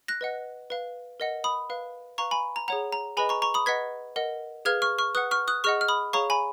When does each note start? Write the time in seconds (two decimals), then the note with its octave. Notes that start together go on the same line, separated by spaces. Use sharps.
0.08 F#6 A#6
0.21 B4 D#5 F#5
0.70 B4 F5
1.20 A#4 D#5 F#5
1.44 B5 D#6
1.70 B4 F5
2.18 B4 F5 A#5 C#6
2.31 G#5 B5
2.56 A#5
2.68 G#4 C#5 F#5 A#5
2.92 A#5
3.17 G#4 B4 D#5 G#5 B5
3.29 A#5 C#6
3.42 A#5 C#6
3.54 B5 D#6
3.66 B4 D#5 F#5 G#6 B6
4.16 A#4 D#5 F#5
4.65 G#4 B4 F5 F6 G#6
4.82 C#6 F6
4.98 C#6 F6
5.15 B4 F#5 D#6 F#6
5.31 C#6 F6
5.48 D#6 F#6
5.64 G#4 D#5 F#5 C#6 F6
5.81 F6
5.88 B5 D#6
6.13 G#4 C#5 F5 A#5 C#6
6.30 G#5 B5